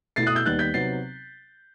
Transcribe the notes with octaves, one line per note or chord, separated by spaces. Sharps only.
B2 A3 E4 A6 C7
D#6 F#6
E6 G6
D#2 D#3 G3 B3 D#4 F#6 A6
G6 B6
C3 F#3 B3 D#4 A6 C7